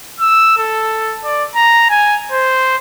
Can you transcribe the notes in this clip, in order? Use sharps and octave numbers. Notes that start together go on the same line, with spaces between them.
E6
A4
D5
A#5
G#5
C5